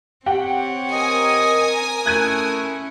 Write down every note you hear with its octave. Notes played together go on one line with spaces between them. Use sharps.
C4 G4 C#5 F#5 G5
A#4 D#5 G#5 D#6
A3 C#4 E4 F#6 G#6 D#7